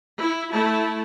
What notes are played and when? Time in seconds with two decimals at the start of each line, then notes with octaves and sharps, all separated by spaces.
0.21 E4
0.53 A3 E4 A5